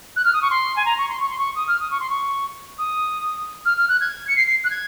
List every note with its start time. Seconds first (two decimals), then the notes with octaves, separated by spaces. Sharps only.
0.16 F#6
0.24 F6
0.33 D#6
0.41 C#6
0.50 C6
0.76 G#5
0.85 A#5
0.97 C#6
1.08 C6
1.20 C#6
1.29 C6
1.38 C#6
1.55 D#6
1.67 F6
1.79 D#6
1.90 C#6
2.00 C6
2.09 C#6
2.78 D#6
3.65 F6
3.77 F6
3.88 F#6
4.00 G#6
4.27 C#7
4.36 C7
4.47 C7
4.64 F#6
4.70 G#6